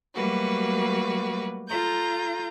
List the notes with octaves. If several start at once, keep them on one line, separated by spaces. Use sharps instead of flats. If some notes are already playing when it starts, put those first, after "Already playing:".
F#3 G3 A3 A#3 F#4 B4
F4 A4 A#5 G6